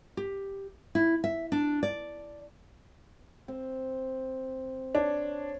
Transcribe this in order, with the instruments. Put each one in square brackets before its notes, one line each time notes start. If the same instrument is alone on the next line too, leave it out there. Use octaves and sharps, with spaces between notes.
[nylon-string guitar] G4
E4
E5
D4
D5
[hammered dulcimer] C4
[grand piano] D4 [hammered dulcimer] C#5